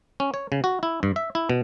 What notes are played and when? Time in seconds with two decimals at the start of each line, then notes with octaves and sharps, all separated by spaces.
0.20 C#4
0.34 C#5
0.52 C#3
0.64 F#4
0.83 E4
1.03 G2
1.16 E5
1.35 E4
1.50 B2